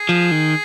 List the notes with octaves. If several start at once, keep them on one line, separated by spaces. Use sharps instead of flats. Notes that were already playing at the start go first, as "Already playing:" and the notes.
Already playing: G#4
F3
D#3